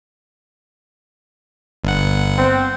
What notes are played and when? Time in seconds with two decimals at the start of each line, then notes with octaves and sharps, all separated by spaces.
1.84 G1 F#5
2.38 C4